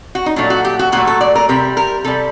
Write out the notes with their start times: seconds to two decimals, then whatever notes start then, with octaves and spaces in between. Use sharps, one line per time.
0.15 F#4
0.26 D#4
0.36 A#2 F#3 A3 D4
0.50 F#4
0.65 G4
0.79 F#4
0.92 A#2 F#3 A3 F#4
1.07 A4
1.21 D5
1.35 A#4
1.49 C3 G3 A#4
1.77 A#4
2.04 C3 G3 A4